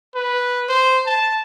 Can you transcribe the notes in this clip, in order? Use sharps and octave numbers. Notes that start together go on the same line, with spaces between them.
B4
C5
A5